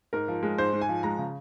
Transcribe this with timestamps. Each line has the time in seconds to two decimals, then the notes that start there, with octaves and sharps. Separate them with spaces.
0.13 G#2 A#4
0.28 F3
0.43 G#3
0.58 G#2 C5
0.73 G#2
0.81 G#5
0.89 F3
1.03 G#3 A#5
1.18 C#3